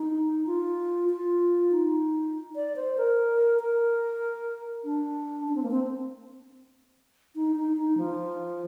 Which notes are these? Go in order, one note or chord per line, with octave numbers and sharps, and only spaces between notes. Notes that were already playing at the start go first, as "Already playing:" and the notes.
Already playing: D#4
F4
F4
D#4
D5
C5
A#4
A#4
D4
D4
C4
A#3
C4
D#4
D#4
D#4
F3